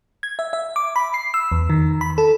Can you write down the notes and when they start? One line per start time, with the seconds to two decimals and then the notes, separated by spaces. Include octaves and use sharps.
0.23 G#6
0.39 E5
0.53 E5
0.76 D6
0.96 B5
1.14 C7
1.34 E6
1.52 E2
1.70 D#3
2.01 B5
2.18 A4